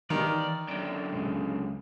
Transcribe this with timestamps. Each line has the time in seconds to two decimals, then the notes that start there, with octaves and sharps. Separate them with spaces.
0.10 D#3 E3 D5 F5
0.68 F#2 D3 D5 G5
1.13 C#2 A#2 C#3